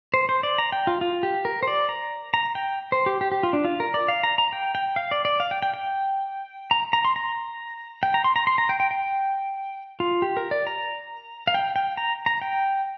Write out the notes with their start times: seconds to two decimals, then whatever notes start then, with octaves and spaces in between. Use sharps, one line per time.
0.14 C5
0.29 C5
0.43 D5
0.58 A#5
0.72 G5
0.87 F4
1.01 F4
1.23 G4
1.45 A#4
1.63 C5
1.67 D5
1.89 A#5
2.34 A#5
2.55 G5
2.92 C5
3.06 G4
3.21 G4
3.32 G4
3.43 F4
3.53 D4
3.65 F4
3.80 A#4
3.94 D5
4.08 F5
4.23 A#5
4.38 A#5
4.53 G5
4.75 G5
4.96 F5
5.11 D5
5.25 D5
5.40 F5
5.51 G5
5.62 G5
5.74 G5
6.71 A#5
6.93 A#5
7.05 C6
7.16 A#5
8.03 G5
8.14 A#5
8.24 C6
8.36 A#5
8.47 C6
8.58 A#5
8.69 G5
8.80 G5
8.91 G5
10.00 F4
10.22 G4
10.37 A#4
10.51 D5
10.67 A#5
11.47 F5
11.54 G5
11.76 G5
11.97 A#5
12.26 A#5
12.42 G5